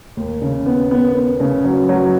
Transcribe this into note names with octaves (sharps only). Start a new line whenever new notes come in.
D#2
C#3
B3
B3
B3
C#3
F#3
F#3